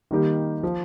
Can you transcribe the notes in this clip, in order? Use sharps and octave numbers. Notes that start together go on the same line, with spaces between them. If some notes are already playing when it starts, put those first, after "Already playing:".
D#3 G3 A#3 D#4 G4
F3